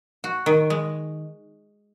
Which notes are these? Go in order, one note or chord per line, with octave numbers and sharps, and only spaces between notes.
F#4
D#3
G#3